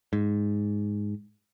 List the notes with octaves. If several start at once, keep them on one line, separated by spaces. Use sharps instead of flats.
G#2